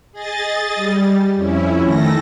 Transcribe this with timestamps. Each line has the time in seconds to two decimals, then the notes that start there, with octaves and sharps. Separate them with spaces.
0.12 G#4 D#5 A6
0.75 G3
1.35 F2 C#4 E4
1.83 D#3 A3 A4 A#6